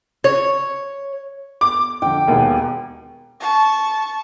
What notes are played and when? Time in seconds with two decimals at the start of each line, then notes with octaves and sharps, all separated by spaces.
0.24 C#5
1.61 D6
2.02 F2 D3 G5
2.27 E1 D#2 B2
3.40 A5 C#6